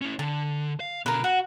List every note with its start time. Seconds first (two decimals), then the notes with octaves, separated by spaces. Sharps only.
0.01 C#4 E4
0.19 D3 A5
0.80 F5
1.06 B2 D3 A#4 B4
1.24 F#4 F#5